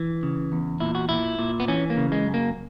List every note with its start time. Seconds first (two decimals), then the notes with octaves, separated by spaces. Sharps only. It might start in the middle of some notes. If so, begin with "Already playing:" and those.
Already playing: E3
0.23 C#3
0.52 E2
0.80 A#2 E4
0.95 F#4
1.09 A#2 E4
1.39 A#2
1.60 B3
1.68 E3 C#4
1.90 A#3
1.97 C#3
2.12 G#3
2.26 F#2
2.34 A#3